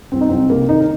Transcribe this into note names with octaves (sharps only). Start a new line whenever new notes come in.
C2 C4
D#4
C2 C4
C3 A#3
D#3 D#4
A#4